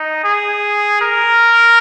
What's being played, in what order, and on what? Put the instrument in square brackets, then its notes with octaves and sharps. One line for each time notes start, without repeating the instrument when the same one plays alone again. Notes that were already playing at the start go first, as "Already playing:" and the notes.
Already playing: [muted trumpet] D#4
G#4
A#4